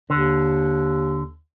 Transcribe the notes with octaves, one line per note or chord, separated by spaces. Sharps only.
D#2 D3